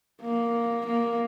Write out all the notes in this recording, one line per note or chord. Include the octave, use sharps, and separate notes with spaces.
A#3
A#3